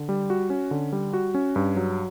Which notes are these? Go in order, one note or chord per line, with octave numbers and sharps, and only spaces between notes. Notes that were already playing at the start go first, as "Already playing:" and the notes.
Already playing: D3
G3
F#4
C#4
D3
G3
F#4
C#4
G2
F#3